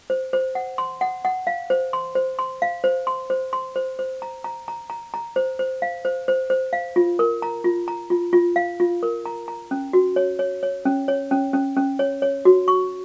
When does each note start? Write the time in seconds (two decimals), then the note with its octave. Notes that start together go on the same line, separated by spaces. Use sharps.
0.10 C5
0.33 C5
0.55 F#5
0.78 C6
1.01 F#5
1.25 F#5
1.47 F5
1.70 C5
1.93 C6
2.15 C5
2.39 C6
2.62 F5
2.84 C5
3.07 C6
3.30 C5
3.53 C6
3.76 C5
3.99 C5
4.22 A#5
4.44 A#5
4.68 A#5
4.90 A#5
5.14 A#5
5.36 C5
5.59 C5
5.82 F5
6.05 C5
6.28 C5
6.50 C5
6.73 F5
6.96 F4
7.19 A#4
7.42 A#5
7.64 F4
7.88 A#5
8.10 F4
8.33 F4
8.56 F5
8.80 F4
9.03 A#4
9.26 A#5
9.48 A#5
9.71 C#4
9.93 F#4
10.16 C#5
10.39 C#5
10.63 C#5
10.85 C#4
11.08 C#5
11.31 C#4
11.53 C#4
11.77 C#4
11.99 C#5
12.22 C#5
12.45 F#4
12.68 C#6